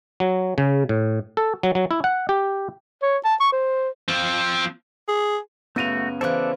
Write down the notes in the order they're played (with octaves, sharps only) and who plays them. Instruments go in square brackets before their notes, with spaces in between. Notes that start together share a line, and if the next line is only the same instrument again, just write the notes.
[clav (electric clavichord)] F#3
C#3
A2
A4
F#3
F#3
E4
F#5
G4
[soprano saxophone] C#5
A5
C#6
C5
[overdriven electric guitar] F3 C4
[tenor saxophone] G#4
[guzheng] F#2 C#3 [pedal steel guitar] A3 F#4 [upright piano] B3 D#7 F7
[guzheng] C#3 E3 [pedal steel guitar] A4 D5 F#6 [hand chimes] B4 C5